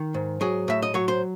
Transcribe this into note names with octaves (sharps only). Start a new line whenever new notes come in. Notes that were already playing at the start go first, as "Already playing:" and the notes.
Already playing: D#3
G#2
F#3 G#4
A2 E5
D#5
F#3 C#5
C5